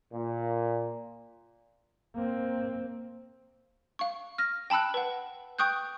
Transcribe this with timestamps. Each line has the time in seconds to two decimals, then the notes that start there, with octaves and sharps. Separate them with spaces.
0.13 A#2
2.15 A#3 C4
3.99 F5 C#6
4.38 F6 A#6
4.70 G5 A5 B5 E6 F#6
4.94 B4 F#5
5.59 G5 C#6 D#6 F#6 G6